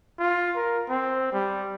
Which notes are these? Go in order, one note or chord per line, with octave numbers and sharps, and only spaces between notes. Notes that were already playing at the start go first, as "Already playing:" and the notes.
F4
A#4
C4
G3